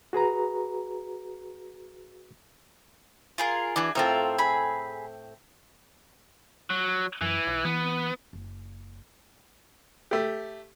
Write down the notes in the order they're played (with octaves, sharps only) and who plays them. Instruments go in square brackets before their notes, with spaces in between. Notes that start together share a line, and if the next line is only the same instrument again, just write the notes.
[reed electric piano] F#4 G#4 B4 A#5
[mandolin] F4 G#4 A#4
[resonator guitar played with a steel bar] E3 [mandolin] D4 F#4 G#4
[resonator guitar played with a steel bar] A2 C4 A4 [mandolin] F4 A#4
[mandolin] G#4 B5
[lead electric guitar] F#3
[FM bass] F#2 [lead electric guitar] E3
[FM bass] B1
[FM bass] E3 [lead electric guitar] B3
[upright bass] F#1
[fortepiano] A3 G4